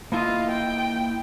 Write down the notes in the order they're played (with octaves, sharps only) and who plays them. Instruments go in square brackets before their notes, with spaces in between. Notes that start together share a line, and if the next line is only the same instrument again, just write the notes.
[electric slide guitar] A#3 E4 D#5 [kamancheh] F4
[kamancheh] G5